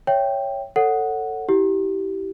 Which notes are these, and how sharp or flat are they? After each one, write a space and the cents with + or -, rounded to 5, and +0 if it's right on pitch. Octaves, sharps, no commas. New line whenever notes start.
C#5 +0 E5 +0 G5 +0
A4 +20 C#5 +0 F#5 +0
E4 -15 G4 -20